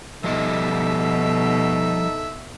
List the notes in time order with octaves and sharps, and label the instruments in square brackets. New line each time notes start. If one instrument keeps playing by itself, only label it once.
[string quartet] B2 [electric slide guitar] F3 G3 D#5 [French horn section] D#4 A4 [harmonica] E5